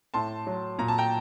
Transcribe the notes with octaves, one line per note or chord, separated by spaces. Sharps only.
A2 A5 C6
F#3
A#2 A#5
A5
G5 A#5